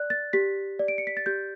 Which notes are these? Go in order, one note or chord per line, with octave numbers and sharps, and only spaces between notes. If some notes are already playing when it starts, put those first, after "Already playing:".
Already playing: D5 F#6
A6
G4 B6
D5
D7
C#7
B6
A6
G4 G6